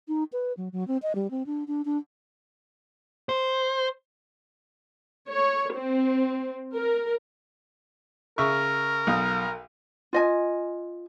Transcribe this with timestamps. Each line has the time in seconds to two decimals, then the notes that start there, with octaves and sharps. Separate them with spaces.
0.08 D#4
0.33 B4
0.57 F#3
0.73 F#3
0.88 C4
1.02 D#5
1.15 G3
1.31 C4
1.46 D4
1.67 D4
1.85 D4
3.29 C5
5.29 C#5
5.75 C4
6.76 A#4
8.38 C#3 A#4 E5 C#6
9.07 B1 F5 D#6
10.13 F4 D#5 G#5